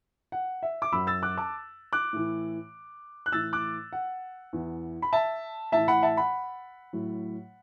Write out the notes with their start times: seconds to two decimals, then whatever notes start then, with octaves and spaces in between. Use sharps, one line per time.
0.32 F#5
0.63 E5
0.82 D6
0.92 F#2 F#3 B5 E6
1.07 E6 A6
1.23 D6 F#6
1.37 A5 D6
1.93 D6 F#6
2.13 A2 E3
3.26 F#6
3.32 A2 E3 E6 A6
3.53 D6 F#6
3.93 F#5
4.53 E2 E3
5.02 B5
5.13 E5 A5
5.72 A2 E3 E5 A5
5.88 F#5 B5
6.03 E5 A5
6.17 F#5 B5
6.93 A2 F#3